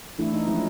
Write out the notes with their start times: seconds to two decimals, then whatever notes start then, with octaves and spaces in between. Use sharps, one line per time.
0.18 E3 A3 D4 E4
0.34 D#4
0.47 F3 G#3 C#4 E4